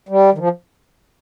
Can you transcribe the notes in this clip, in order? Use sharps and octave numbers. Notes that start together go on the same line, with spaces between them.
G3
D#3
F3